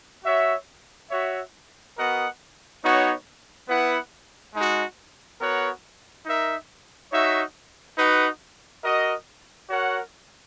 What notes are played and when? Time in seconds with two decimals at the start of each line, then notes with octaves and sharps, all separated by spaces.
0.24 F#4 C#5 E5
1.11 F#4 C#5 E5
1.96 B3 F#4 A#4 D#5 F#5
2.83 B3 D#4 F#4 C#5
3.68 B3 E4 B4 F#5
4.54 G#3 D#4 F#4
5.40 B3 F#4 A#4 C#5 F#5
6.26 D#4 A#4 E5
7.12 D#4 F#4 C#5 E5
7.97 D#4 F#4 B4 F#5
8.83 F#4 A#4 D#5
9.69 F#4 A#4 C#5 F#5